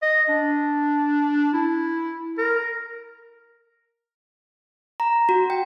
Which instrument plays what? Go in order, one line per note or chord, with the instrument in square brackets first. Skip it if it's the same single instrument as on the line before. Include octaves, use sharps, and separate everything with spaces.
[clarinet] D#5
D4
E4
A#4
[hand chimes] A#5
F#4
G5